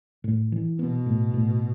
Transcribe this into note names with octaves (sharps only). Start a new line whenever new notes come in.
A2
E3
B2 B3
A2
A2